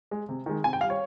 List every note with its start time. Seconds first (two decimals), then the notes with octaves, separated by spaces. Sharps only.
0.11 G#3
0.29 C3
0.46 D#3 G#3
0.64 C3 G#5
0.73 G5
0.81 G3 F5
0.90 C#5